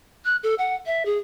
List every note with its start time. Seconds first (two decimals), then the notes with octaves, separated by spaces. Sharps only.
0.25 F#6
0.43 A4
0.58 F#5
0.86 E5
1.05 G#4